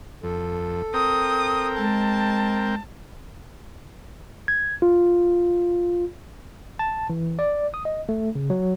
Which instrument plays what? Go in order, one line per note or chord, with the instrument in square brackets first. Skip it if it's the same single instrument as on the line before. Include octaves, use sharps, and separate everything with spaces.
[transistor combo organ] F2 [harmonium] A4
[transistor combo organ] C4 A#4 G5 [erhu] D#6
[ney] G#3 [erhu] A5
[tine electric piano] G#6
F4
A5
E3
D5
D#6
D#5
A3
C#3
F#3